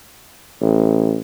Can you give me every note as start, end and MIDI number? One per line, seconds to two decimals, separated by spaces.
0.61 1.18 33